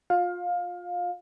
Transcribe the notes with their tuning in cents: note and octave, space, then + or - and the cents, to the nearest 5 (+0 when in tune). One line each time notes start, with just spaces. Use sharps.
F4 +25 F5 +20